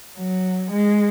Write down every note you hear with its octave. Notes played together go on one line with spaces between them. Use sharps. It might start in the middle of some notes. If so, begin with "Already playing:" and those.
F#3
G#3